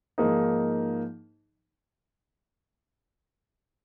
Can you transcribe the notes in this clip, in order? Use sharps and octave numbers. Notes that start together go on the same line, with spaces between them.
G#2 F3 A#3 D#4 G#4